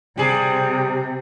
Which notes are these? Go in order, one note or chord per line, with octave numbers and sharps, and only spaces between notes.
C3 G3 G#4